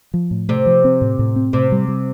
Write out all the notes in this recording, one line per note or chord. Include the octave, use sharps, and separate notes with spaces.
F3
A2
C3 A3
F3
C4
A2
A2
C4
A2 C3
G3
G3